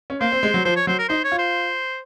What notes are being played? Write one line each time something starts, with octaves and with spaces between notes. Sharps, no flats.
C#4
A#3 C5
C4
G#3
F#3
F3 C5
C#5
F#3 C5
A#4
D#4 C5
C#5
F4
C5